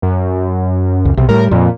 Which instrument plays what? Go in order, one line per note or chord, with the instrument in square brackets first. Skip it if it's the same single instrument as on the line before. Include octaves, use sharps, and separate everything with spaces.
[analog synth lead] F#2
[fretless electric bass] C#2
[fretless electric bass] B1 [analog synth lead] C3
[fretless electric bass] A2 G3 [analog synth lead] A#4
[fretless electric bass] F2 [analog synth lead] A#2